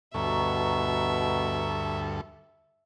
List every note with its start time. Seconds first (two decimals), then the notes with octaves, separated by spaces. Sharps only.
0.14 D2 G2 B2 A4 E5 A#5 C#6